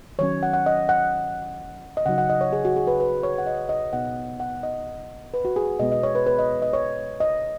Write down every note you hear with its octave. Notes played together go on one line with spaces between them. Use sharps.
D#3 F#3 C#4 C#5
F#5
F#5
D#5
F#5
D#5
C#3 F#3 D#4 F#5
F#5
D#5
C#5
G#4
F#4
G#4
B4
B4
C#5
F#5
D#5
D#5
B2 B3 D#4 F#5
F#5
D#5
B4
F#4
G#4
B2 G#3 B3 D#5
D#5
C#5
B4
B4
D#5
D#5
C#5
D#5